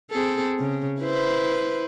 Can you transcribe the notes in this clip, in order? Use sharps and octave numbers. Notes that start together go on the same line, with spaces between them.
C4 G#4 A4
C#3
E4 B4 C5